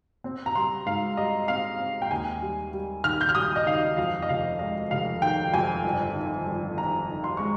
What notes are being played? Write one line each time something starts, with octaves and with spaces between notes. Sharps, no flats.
C4
A#5
G3 C6
G#2 F5
G3 D#5
C4 F5
C4
G5
D#2 G#5
G3
G3
D#3 F6
G6
F6
G3 D#6
D#5
D#3 F5
F2 F5
D#5
F1 F5
G#3 D#5
F1 F5
D#3 G5
F2 G#5
G1
D#3
G1
D#3 A#5
D#3
C6
G#3 C#6